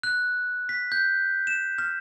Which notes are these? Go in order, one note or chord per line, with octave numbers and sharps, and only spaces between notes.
F#6
B6
G6
E7
F6